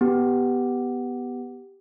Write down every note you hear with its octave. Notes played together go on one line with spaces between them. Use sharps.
B3 G4